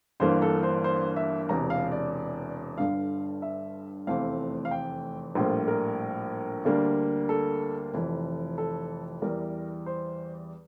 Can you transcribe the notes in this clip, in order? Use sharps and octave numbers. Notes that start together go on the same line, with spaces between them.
G1 G2 E3 A#3 C5
A4
C5
C5
E5
E1 E2 C3 E3 A#5
F5
D5
G1 G2 D3 F5
E5
F1 E2 E3 A3 C4 F5
F5
G5
A#1 A2 G3 A#3 C5
A#4
D2 D3 G3 A#3
A4
F1 F2 E3
A4
E2 E3 G3 A#4
C5